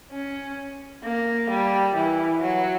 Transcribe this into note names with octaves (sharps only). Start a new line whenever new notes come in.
C#4
A#3
G3
E3
F#3